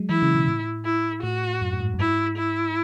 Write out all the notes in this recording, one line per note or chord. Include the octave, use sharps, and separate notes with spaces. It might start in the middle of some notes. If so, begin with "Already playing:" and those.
Already playing: F#3 G#3
E3 E4
C#3
B2
A2
E4
A2 F#4
F#2
A2
G#2
F#2
G#2 E4
E4